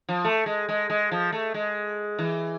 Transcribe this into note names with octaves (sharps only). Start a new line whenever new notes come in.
F3
A3
G#3
G#3
G#3
F3
A3
G#3
E3